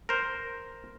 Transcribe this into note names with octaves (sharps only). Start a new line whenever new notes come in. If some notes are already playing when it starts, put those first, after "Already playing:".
A#4 C5